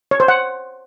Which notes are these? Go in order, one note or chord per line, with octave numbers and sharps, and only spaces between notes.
C#5
C5
F#5